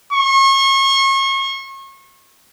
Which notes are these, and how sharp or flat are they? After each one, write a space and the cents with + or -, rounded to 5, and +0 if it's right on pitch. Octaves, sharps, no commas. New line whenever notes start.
C#6 -35